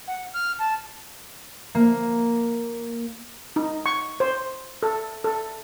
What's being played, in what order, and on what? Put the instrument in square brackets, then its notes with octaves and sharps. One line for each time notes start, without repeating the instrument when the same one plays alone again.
[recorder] F#5
F6
A5
[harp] A#3
[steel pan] D#4
C#6
C5
A4
A4